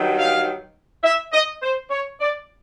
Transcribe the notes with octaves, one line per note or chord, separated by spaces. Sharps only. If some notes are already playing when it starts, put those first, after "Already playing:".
Already playing: G2 D#3 F#3
F5
E5
D#5
C5
C#5
D5